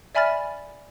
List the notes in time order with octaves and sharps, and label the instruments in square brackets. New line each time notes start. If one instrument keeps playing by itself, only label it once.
[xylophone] D5 E5 G#5 B5 F6 A6